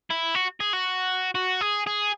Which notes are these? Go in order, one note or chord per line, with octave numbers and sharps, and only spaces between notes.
E4
F#4
G#4
F#4
F#4
G#4
G#4